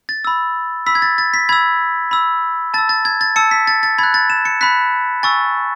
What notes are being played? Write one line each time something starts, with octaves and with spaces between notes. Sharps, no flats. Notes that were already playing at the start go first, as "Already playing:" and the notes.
A6
B5 E6
B5 E6 B6
G#6
A6
A6
B6
B5 E6 G#6
B5 E6
A5 E6 A6
A6
G#6
A6
A5 E6 C#7
B6
A6
A6
B5 F#6 G#6
A6
E7
C#7
B5 F#6 B6
G#5 C#6 E6 A6